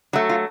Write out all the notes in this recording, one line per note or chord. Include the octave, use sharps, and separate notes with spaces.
F#3 A3 F#4
F4